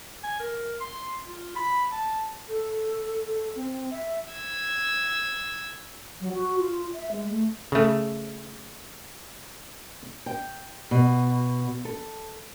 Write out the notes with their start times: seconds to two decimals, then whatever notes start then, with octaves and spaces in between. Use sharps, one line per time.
0.24 G#5
0.40 A#4
0.80 C6
1.27 F4
1.56 B5
1.92 A5
2.48 A4
3.28 A4
3.55 C4
3.91 E5
4.33 E6 G#6
6.21 F#3
6.34 F#4
6.59 F4
6.94 E5
7.11 G#3
7.30 A3
7.72 C#3 A3
10.26 G5
10.91 B2
11.85 A4